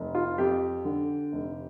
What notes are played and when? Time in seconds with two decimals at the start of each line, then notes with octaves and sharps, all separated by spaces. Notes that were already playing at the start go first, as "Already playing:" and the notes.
Already playing: F1
0.15 F4
0.38 F2 G4
0.85 D3
1.32 F1